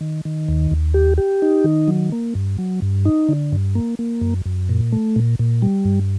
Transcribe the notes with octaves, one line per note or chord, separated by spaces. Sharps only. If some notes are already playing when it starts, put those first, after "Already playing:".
D#3
D#3
D#2
D#2
G4
G4
D#4
D#3
F#3
A#3
G2
F#3
G2
D#4
D3
G2
A#3
A#3
F#2
F#2
A#2
A3
A#2
A#2
G3
G2